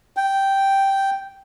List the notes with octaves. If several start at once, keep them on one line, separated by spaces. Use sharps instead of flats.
G5